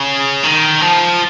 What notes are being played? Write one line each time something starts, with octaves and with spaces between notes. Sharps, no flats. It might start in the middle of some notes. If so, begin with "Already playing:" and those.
Already playing: C#3
D#3
F3